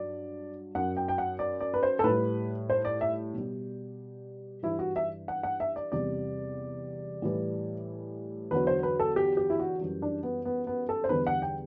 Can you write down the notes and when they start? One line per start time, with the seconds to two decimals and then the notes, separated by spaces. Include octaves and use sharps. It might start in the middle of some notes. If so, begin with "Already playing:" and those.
Already playing: G2 F#3 D5
0.75 F#2 F#3 F#5
0.97 G5
1.08 G5
1.18 F#5
1.39 D5
1.61 D5
1.74 B4
1.83 C5
1.99 A4
2.04 A2 B4
2.09 G3
2.70 C5
2.85 D5
3.01 E5
3.34 B2 G3
4.63 G2 E3 G3 E4
4.79 F#4
4.96 E5
5.28 F#5
5.43 F#5
5.60 E5
5.76 D5
5.92 E2 C3 G3 D5
7.22 A2 E3 G3
8.51 E2 D3 F#3 B4
8.67 C5
8.83 B4
9.00 A4
9.16 G4
9.37 G4
9.50 E4
9.59 F#4
9.81 F#2 E3 G3
10.02 D4
10.23 B3
10.45 B3
10.67 B3
10.89 A4
11.04 C5
11.09 E2 D3 G3 B4
11.27 F#5
11.42 G5